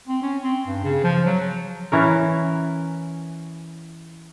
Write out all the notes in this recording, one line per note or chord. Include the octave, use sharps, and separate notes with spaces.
C4
C#4
C4
G2
C#3
F3
F#3
E3 C#4 A#4